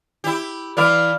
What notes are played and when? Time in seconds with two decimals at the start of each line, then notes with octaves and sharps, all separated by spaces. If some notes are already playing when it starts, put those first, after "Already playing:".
0.24 E4 G4
0.77 E3 E4 D5 F5